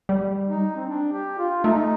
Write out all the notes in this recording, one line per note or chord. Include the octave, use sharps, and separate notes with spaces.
G3
D#4
C4
D4
G4
F4
A3 D#4